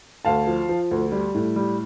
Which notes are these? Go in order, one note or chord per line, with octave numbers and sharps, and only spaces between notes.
D2 F5 A5
F3
F3
D2
G3
A2
G3